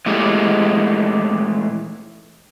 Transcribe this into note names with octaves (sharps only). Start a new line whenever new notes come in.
A#2 E3 G#3 A3 G4